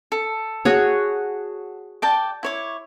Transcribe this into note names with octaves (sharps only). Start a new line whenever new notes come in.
A4
F#4 G#4 C#5
D5 G5 A5
E4 C#5 D6